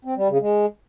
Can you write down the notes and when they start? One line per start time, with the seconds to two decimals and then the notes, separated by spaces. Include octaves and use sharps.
0.05 C4
0.17 G3
0.29 C#3
0.41 G#3